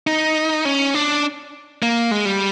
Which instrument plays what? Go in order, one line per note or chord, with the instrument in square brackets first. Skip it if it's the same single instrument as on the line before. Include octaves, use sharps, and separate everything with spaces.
[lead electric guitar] D#4
C#4
D4
A#3
G#3
G3